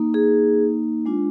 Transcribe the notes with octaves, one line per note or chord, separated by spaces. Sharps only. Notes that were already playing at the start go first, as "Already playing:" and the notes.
Already playing: A#3 D#4
G#4
G#3 D4 F4